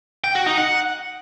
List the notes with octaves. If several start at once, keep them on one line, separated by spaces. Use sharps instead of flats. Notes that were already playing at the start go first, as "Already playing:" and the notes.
G5
F#4
D#4
F#5